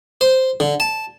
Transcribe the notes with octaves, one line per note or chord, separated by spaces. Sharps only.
C5
D3
A5